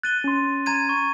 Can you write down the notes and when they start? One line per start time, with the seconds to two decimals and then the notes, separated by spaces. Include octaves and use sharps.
0.03 F#6 A6 D#7 G7
0.24 C#4 C6
0.66 A#5 G#6 D#7
0.89 C#6